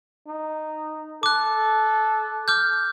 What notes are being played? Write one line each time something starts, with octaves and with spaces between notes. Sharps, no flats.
D#4
A4 D6 F#6
D6 F6 G6